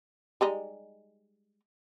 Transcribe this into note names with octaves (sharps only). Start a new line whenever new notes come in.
G3 G#3 D#4